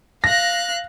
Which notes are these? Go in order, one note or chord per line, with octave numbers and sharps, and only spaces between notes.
F5 F#6 A#6